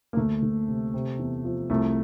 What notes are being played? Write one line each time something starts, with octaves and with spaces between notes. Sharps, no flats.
A#3
D2 A3
D2
C3
C3
E2
F3
C2 A3